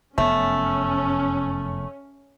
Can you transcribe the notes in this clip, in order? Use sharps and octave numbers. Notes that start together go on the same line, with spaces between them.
F1 F#2 A3 B3 C#4